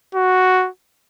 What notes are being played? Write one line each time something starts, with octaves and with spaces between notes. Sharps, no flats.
F#4